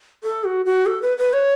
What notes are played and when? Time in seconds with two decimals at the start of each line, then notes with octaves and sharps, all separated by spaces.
0.23 A4
0.44 F#4
0.66 F#4
0.86 A4
1.02 B4
1.18 B4
1.33 C#5